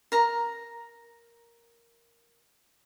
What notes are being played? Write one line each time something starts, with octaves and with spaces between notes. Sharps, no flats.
A#4 A#5